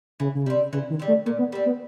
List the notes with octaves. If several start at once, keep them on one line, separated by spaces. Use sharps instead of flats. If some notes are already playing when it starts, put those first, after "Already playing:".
C#3 E3
C#3
C3 G3 C4
C#3 E3
D#3
G3 C4
A3
A#2 A#3
B3
G3 C4
B3